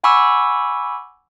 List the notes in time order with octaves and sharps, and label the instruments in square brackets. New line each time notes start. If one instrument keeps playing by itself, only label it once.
[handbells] F#5 G#5 B5 C#6 D6 E6